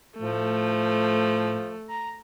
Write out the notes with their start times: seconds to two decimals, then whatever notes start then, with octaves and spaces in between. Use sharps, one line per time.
0.19 A2 F3 A3
1.88 A#5